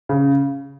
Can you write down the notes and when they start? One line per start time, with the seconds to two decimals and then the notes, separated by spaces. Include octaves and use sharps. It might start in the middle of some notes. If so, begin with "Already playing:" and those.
0.09 C#3